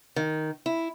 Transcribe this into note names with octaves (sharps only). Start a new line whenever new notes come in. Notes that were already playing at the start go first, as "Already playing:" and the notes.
D#3
E4